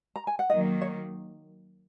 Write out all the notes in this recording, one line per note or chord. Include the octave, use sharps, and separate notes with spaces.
A#5
G#5
F#5
D#3 F#3 A#3 D#5
C#5